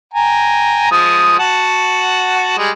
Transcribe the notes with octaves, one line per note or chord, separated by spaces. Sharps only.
G5 G#5 A#5
F3 G#3 D#6
F#4 F#5 A5
G3 G#3 G#4